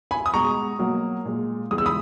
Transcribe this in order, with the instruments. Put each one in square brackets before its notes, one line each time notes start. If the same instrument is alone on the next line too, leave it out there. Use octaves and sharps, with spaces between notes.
[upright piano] G#5 B5
D#6
B2 G#3 A#5 C#6
B2 F#3 A#3
A#2 G#3
E2 C#3 G#3 D#6
E6
B5 D#6